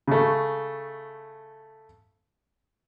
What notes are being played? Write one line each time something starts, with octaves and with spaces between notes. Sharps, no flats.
C#3 A3